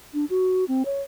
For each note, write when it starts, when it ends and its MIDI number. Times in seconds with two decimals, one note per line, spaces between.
0.14 0.25 62
0.30 0.64 66
0.68 0.83 60
0.85 1.02 73